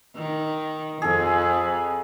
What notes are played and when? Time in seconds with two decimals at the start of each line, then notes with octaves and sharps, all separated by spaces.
0.15 D#3
1.02 F2 G#4 A4